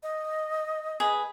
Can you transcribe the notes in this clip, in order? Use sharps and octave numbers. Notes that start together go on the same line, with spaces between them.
D#5
G#4 B4